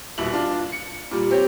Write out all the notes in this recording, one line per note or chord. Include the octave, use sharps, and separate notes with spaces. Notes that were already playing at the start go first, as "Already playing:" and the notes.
D#1 B2 E4 F#7
D4 F4
C#7
A#2 G3
C4 G4 C#5